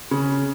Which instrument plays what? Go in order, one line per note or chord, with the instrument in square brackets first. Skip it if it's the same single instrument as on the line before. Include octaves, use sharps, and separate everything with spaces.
[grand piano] C#3